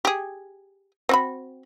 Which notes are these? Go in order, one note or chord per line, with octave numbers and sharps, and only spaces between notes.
G4 G#4
C4 F#4 B5